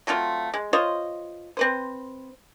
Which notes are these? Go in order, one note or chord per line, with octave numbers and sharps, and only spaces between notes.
F#3 A3 C4 F4
G#3
F4 C5 C#5 D#5
C4 B4 C5